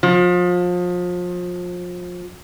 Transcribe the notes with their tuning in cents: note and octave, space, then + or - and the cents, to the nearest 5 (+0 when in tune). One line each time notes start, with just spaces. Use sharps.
F3 +30